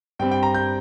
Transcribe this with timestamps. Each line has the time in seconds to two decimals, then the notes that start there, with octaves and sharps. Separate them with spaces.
0.19 G2 G3 C4 G5
0.31 G5
0.43 A#5
0.54 G6